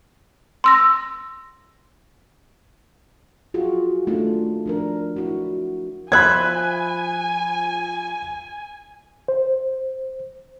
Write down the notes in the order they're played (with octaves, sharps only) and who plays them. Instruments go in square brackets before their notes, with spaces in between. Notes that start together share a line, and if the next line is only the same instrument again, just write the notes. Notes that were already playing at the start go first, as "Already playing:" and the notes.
[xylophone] C6 E6 A#6
[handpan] F4 F#4 G#4
A3 A#3 D4 D#4 F4
F3 D4 A#4
E4 F#4
[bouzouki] F3 E5 [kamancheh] G#5 [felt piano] B5 F#6 G#6
[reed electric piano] C5